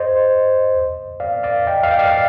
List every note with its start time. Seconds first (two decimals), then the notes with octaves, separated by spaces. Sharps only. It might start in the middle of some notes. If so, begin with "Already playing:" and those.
Already playing: C5 D#5
1.20 D5 F5
1.43 D5 F5
1.67 D#5 G5
1.83 D5 F5
1.91 G5
1.99 D5 F5